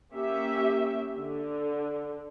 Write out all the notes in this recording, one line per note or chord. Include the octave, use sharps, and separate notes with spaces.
A#3 C#4 G4 E5
D3